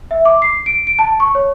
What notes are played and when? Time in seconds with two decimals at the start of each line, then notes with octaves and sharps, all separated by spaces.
0.11 E5
0.25 D6
0.42 C7
0.66 D7
0.87 D7
0.99 A5
1.20 C#6
1.35 C#5